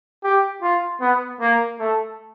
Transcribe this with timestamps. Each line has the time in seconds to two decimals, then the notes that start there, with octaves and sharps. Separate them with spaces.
0.24 G4
0.62 F4
1.00 B3
1.40 A#3
1.79 A3